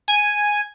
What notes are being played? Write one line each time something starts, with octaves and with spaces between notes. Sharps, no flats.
G#5